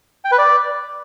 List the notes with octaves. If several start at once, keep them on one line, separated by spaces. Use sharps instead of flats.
G5
B4
D5